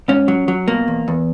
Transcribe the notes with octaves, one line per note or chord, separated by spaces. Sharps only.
G#2 C#4
F#3
F#3
B2 A#3
E2
E2